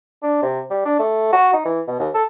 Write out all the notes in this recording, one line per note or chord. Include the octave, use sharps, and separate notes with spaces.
D4
C3
G3
D4
A3
F#4
D#4
E3
B2
D#2
A4